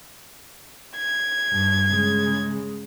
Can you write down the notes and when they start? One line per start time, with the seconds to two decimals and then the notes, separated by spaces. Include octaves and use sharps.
0.96 G#6
1.52 G2
1.90 C#3 G#3